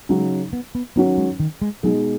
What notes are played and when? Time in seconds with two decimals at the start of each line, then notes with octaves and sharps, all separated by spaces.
0.09 C#3 F#3 G#3 D#4
0.53 B3
0.75 B3
0.96 D#3 F#3 B3 C#4 F#4
1.18 G#3
1.40 D#3
1.62 G#3
1.83 B2 F#3 G#3 D#4 G#4